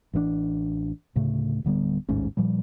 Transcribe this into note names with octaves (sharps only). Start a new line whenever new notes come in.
A1 E3 A#3 D4
D2 A2 C#3 A3
D1 D3 G3 B3
A1 D#2 G#2 C#4
A#2 F3 G3